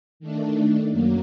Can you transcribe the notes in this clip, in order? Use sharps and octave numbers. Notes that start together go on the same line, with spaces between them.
D#3 A3 D4
F#2 F#3 A#3